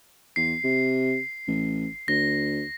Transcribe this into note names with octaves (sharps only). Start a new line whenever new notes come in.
E2 C7
C3
A1
D2 A#6